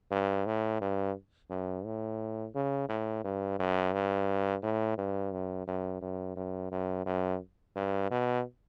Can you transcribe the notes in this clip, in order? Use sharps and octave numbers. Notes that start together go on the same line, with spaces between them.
G2
A2
G2
F#2
A2
C#3
A2
G2
F#2
G2
A2
G2
F#2
F#2
F#2
F#2
F#2
F#2
G2
B2